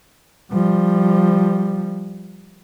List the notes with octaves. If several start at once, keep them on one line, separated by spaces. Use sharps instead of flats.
F3 G3